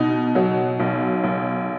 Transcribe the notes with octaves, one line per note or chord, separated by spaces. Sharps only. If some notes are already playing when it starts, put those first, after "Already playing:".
Already playing: B2 D#4
F#3
B1
B1